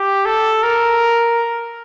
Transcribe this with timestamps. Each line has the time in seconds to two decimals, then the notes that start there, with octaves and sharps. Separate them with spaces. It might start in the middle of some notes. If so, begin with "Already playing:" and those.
Already playing: G4
0.25 A4
0.63 A#4